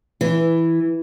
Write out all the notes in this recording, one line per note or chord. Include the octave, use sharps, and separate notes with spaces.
E3